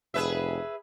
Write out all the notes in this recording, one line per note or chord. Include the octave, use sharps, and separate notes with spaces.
F1 G#4 B4 E5